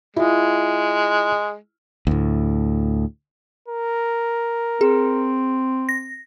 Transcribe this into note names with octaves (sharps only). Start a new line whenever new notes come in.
G#3 E4 F4
D2 A2
A#4
C4 G#4
A#6